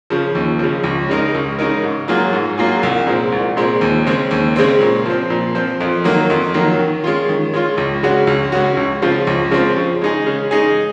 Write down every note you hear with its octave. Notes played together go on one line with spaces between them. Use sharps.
C#3 F3
D#2
C#3 F3
C#2
C#3 G#3 D#4 A#4
C#2
C#3 G#3 D#4 A#4
G#2
F#3 A#3 F4 G#4
G#2
F#3 A#3 F4 G#4
C2
A#2 G#3 C4
C2
A#2 G#3 C4
D#2
C#3 G#3 C4
D#2
C#3 G#3 C4
A#2
F3 C4
A#2
F3 C4
F2
D#3 F#3 A#3
F2
D#3 F#3 A#3
D#3
G#3 C#4 F4
D#3
G#3 C#4 F4
C#2
C#3 G#3 C#4 F#4
C#2
C#3 G#3 C#4 F#4
C#2
C#3 F3 C4 F4
C#2
C#3 F3 C4 F4
C#3
G#3 D#4 G#4
C#3
G#3 D#4 G#4